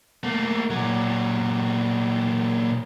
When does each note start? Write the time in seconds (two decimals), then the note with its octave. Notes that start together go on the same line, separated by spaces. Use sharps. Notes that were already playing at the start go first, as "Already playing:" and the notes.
0.24 A3 A#3
0.70 A#2 F#3